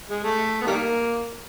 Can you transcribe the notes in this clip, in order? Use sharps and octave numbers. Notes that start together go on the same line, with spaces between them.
G#3
A3
B3
D#3 G3 A#3